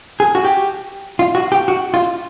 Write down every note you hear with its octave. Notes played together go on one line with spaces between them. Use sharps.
G#4
F#4
G4
F4
F#4
G4
F#4
F4